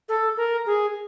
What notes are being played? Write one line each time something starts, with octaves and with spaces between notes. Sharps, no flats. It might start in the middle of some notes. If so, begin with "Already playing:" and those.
A4
A#4
G#4